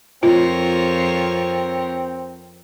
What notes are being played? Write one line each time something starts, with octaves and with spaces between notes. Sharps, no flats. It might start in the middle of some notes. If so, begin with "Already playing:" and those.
F2 C4 F4 A#4 C#5